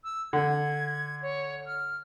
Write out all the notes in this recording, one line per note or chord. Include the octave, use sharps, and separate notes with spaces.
E6
D3 G#6
C#5
F6